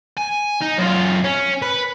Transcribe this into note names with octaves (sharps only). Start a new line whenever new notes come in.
G#5
D#4
F#2 F4
C#4
B4